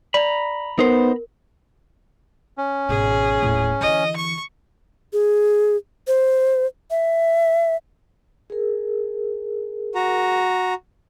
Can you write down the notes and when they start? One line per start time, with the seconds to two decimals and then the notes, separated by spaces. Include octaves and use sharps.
0.14 D5 A#5 B5
0.79 B3 D#4 A#4 C5
2.58 C#4
2.89 G#1 B2 G#4
3.43 D#1 A2
3.81 D3 E3 D#5
4.16 C#6
5.13 G#4
6.07 C5
6.91 E5
8.50 G#4 A#4
9.95 F#4 A#5